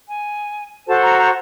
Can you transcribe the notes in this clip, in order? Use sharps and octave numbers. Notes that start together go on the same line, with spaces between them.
G#5
F#4 A4 C5 A5
A#5
A#5